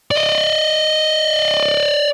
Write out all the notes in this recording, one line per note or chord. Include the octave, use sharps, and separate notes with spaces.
D5 D#5